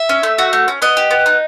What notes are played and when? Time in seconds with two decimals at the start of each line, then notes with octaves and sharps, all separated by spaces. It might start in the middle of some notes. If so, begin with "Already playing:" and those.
Already playing: E5
0.09 C#4
0.23 A3
0.38 F#4
0.53 A3
0.68 C#4
0.82 B3 D#5
0.97 G4
1.11 B3
1.26 D#4